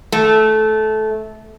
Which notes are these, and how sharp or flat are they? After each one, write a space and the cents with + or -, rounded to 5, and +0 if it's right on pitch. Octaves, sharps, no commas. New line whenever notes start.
A3 -15